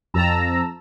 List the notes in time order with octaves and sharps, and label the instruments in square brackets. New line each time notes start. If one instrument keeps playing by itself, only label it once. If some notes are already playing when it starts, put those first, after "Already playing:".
[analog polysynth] F2 A5 A#5 E6